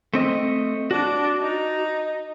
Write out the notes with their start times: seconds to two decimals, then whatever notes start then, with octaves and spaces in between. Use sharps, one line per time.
0.14 A3 C4 D#5
0.91 D4 F#4
1.41 D#4